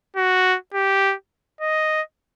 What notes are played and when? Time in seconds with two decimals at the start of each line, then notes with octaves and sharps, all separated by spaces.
0.16 F#4
0.74 G4
1.61 D#5